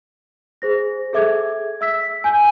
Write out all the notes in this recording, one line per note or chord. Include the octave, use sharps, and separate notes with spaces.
G#4 C5 A#6
G#4 A4 E5 D6 G#6
E5 E6 B6
G#5 G6